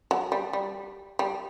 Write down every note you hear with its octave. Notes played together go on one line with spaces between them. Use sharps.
F#3
G3
G3
G3